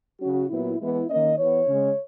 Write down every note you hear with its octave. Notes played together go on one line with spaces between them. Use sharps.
C#3 F#3 C#4 F#4
A#2 F#3 B3 E4
E3 G#3 B3 E4
D#3 A#3 C#4 D#5
E3 B3 C#5
C#3 G#3 C#4